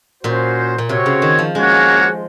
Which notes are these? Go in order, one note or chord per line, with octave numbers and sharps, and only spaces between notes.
A#2 C#4 F#4 C5
A#2
C3 C4 F#4 C#5
C#3
D#3
F3
G#3 A#3 C#4 F#4 C#5 F#5